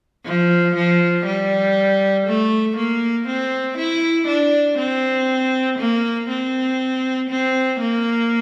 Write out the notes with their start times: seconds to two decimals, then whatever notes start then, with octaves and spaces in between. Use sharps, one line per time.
0.25 F3
0.75 F3
1.26 G3
2.26 A3
2.76 A#3
3.27 C4
3.77 E4
4.27 D4
4.78 C4
5.79 A#3
6.29 C4
7.29 C4
7.80 A#3